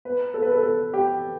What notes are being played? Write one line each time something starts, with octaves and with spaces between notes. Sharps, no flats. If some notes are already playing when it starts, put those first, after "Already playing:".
B4
A4
B4
A4
A4
G4